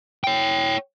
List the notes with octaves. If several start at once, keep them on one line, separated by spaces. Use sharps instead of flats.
C#5 G5